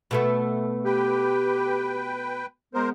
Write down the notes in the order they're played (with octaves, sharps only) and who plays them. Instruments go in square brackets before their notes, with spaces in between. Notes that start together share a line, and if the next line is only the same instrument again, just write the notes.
[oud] B2 A3 B3
[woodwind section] G4 [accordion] B4 G5
[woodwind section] G#3 B3 [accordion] A#4 C5